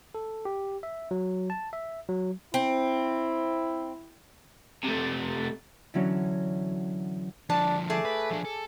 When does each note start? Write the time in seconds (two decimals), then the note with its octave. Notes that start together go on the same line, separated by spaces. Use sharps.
0.15 A4
0.45 G4
0.83 E5
1.11 F#3
1.50 A5
1.73 E5
2.09 F#3
2.54 C4 E4
4.83 C3 A3
5.94 D3 E3 F#3 C#4
7.50 D3 F3 D4 A5
7.90 A3 G#4 D5 A5
8.05 B4
8.31 F3 D4
8.45 A4